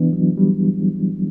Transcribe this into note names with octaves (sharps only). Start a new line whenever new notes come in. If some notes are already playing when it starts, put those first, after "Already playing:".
Already playing: E3 B3 D4 E4
F#3
G3